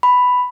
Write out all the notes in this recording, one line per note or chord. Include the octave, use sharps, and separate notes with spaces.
B5